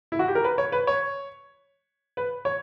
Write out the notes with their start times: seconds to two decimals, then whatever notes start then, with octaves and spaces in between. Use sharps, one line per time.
0.12 E4
0.19 F#4
0.28 G4
0.35 A#4
0.44 B4
0.58 C#5
0.72 B4
0.87 C#5
2.17 B4
2.45 C#5